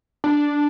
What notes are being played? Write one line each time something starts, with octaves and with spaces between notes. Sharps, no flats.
D4